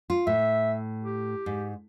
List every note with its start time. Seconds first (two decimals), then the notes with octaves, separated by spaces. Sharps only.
0.10 F4
0.27 A2 E5
1.03 G4
1.46 G#2